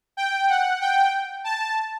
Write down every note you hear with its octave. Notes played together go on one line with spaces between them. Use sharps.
G5
F#5
G5
A5